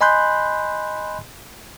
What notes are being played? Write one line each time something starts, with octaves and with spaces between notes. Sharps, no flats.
D#5 G#5 B5 C6 F#6 G6